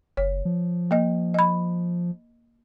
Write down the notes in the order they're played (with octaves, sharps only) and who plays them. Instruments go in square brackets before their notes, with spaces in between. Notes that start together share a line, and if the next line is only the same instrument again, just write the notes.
[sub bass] F#1 [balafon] C#5
[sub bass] F3
[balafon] A#3 D#5
D#5 B5